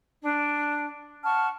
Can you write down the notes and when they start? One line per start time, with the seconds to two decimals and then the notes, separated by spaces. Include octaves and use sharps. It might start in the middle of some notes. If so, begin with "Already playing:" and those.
0.20 D4
1.23 F#5 A5 C#6 F6